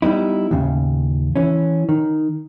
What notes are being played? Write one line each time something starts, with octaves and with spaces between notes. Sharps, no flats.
G3 B3 D#4 E4
D#2 A2 C#3
E3 C#4
D#3